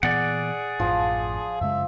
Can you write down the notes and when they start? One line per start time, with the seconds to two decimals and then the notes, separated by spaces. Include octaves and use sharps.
0.03 A#2 E3 B3 G#4 D5 F#5
0.80 A1 F#2 A2 F3
1.61 F#2 C#3 G#3 E5